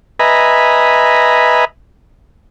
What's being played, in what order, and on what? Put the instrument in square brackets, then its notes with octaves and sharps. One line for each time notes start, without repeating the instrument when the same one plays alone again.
[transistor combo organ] B4 D#5 E5 G#5 A#5 B5